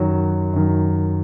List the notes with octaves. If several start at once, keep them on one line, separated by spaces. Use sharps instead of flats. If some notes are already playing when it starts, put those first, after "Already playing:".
Already playing: F#2 D#3 F#3
F#2 D#3 F#3